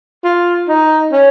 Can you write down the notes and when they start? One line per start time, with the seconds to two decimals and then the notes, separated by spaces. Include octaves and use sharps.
0.24 F4
0.68 D#4
1.13 C#4